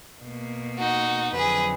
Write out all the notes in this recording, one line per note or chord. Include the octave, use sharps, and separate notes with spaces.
B2 A#3
D#4 F#4
F2 D3 F#3 G#4 B4